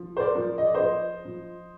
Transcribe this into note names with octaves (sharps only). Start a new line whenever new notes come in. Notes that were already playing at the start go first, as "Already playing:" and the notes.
Already playing: F3
C5
A#4 D5
F3
D#5
D5
C5 D#5
F3
F3